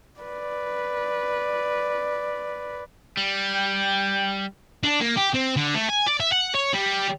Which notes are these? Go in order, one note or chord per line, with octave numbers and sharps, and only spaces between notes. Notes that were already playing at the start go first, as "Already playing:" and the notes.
B4 D5
G3
G5
D4
A#3
G4
C4
D3
A3
G#5
D5
E5
F#5
C#5
G3